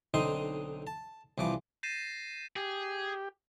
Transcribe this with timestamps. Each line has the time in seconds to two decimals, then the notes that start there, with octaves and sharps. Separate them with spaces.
0.14 B1 D3 C4 D#4 D#5 C6
0.87 A5
1.38 C2 E3 F3 D6
1.83 G6 A6 A#6 C7 D#7 E7
2.56 G4 G#4